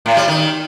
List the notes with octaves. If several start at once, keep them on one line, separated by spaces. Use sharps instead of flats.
A2
G3
D#3